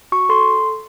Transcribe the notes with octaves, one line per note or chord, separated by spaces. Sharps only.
F#4 C#6
A4 C6